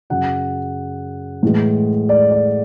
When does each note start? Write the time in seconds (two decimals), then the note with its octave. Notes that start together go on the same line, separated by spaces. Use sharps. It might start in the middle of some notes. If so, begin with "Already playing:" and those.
0.10 F#2 C#3 F#3 F#5
1.43 A2 E3 G#3
2.09 D5
2.31 D5